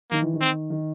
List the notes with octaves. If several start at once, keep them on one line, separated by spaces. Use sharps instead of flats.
D#3 A#3
E3
D#3
C4
D#3